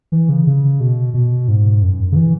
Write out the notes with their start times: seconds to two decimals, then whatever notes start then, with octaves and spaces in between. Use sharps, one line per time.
0.12 E3
0.29 C#3
0.47 C#3
0.80 B2
1.14 B2
1.48 G#2
1.82 F#2
2.12 C#3
2.15 E3